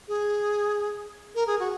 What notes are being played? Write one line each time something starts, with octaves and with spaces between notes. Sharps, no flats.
G#4
A#4
G#4
F#4